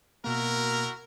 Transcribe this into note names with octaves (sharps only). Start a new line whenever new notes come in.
B2 A#3 E4 F#4 A#4